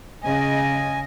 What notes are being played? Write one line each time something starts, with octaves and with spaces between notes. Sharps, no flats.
C#3 D#5 G#5